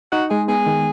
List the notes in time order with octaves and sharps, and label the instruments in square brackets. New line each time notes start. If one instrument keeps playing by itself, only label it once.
[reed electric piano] D#4 [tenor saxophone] F#4
[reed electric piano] G#3 [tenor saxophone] G#4
[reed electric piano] B3 [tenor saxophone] G#4
[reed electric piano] D#3